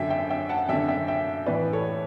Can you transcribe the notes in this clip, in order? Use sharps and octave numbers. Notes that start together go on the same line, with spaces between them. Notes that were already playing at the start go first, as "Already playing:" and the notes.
Already playing: F#2 D3 E5 G5
E5 G5
E5 G5
F#5 A5
F#2 D3 E5 G5
E5 G5
E5 G5
A2 E3 B4 D5
A4 C#5